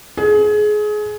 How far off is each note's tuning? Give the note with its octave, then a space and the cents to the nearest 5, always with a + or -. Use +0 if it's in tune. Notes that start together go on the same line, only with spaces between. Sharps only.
G#4 +25